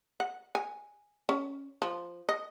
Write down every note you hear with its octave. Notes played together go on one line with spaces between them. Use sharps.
F#5
G#5
C#4
F3
D#5